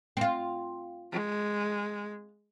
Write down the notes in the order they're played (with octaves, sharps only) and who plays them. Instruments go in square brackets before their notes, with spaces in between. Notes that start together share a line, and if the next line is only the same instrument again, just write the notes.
[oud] C4 F4
[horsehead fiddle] G#3